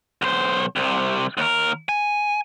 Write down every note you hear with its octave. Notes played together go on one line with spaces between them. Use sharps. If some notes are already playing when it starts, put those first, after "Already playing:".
B1 C5
C2 C3
D#2 A#4
G#5